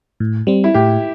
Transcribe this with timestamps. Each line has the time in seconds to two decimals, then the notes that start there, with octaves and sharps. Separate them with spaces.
0.20 A2
0.47 G3 C4
0.64 E4
0.74 A2 G4